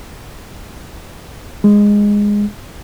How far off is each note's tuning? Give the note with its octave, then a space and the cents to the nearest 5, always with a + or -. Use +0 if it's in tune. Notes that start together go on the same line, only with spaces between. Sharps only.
G#3 -10